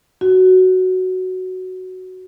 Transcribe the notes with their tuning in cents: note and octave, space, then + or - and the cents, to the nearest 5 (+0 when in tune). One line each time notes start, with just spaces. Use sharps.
F#4 +5